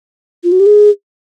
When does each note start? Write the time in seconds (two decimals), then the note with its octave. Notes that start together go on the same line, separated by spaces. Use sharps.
0.44 F4
0.52 F#4
0.60 G4
0.66 G#4